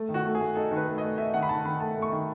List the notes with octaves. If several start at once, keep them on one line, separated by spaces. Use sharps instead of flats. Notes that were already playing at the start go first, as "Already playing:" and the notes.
Already playing: A3
D#3
F#4
A3
G#4
A3
D#4 A4
D#3
B4
A3
D#5
A3
D#4 E5
D#3 F#5
B5
D#3 A5
D#3 B5
A3 A5
A3
C#6
D#3